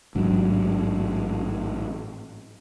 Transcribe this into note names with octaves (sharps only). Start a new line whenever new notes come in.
A1 G#2 F#3 D4